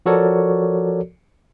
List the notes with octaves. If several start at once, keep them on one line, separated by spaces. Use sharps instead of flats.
F3 F#4 A4 A#4 C#5 D5